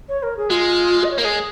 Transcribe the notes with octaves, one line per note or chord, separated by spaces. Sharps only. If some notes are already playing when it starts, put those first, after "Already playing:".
C#5
A#4
G#4
G#3 F4
D#5
C#5
A#3 A#4
G#3 G#4